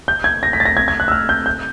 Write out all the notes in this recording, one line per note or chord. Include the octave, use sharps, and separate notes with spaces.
G6
G#6
A#6
B6
A6
A#6
G#6
G#6
F#6
E6
F6
G6
G6